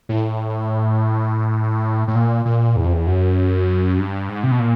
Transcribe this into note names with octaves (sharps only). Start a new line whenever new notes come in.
A2
A2
A#2
A#2
E2
F2
E2
F#2
G2
G#2
C3
B2
A#2